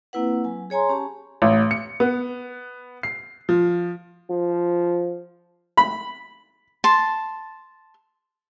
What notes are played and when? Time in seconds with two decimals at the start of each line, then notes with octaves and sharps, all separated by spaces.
0.13 A#3 C4 E4 B4 F#5
0.44 F#3 G#5
0.70 G#4 C#5 G#5 A#5 C6
0.89 C#4 G4 A5
1.42 A1
1.71 C#7
2.00 B3
3.03 C7
3.49 F3
4.30 F3
5.77 B5
6.84 A5 C6